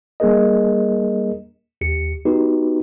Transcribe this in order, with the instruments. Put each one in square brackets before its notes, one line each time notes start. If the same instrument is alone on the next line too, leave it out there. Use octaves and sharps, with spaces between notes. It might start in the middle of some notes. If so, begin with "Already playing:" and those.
[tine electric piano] G3 A#3 D4 G#4 A#4 D#5
D#2 G4 C#7
B3 D#4 F#4 G4 B4